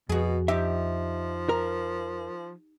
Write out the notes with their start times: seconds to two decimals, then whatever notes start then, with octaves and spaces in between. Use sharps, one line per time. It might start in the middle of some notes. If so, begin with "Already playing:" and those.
0.09 F2 B2 F#4 G#4
0.48 F3 D#4 G4 E5
1.49 A#4